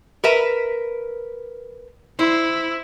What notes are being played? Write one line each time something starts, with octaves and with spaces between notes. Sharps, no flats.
A#4 B4 E5
E4 C5